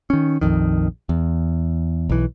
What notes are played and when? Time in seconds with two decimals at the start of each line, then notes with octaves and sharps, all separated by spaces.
0.10 D#3 C#4
0.41 A#1 F2 D#3
1.09 E2
2.09 B1 E3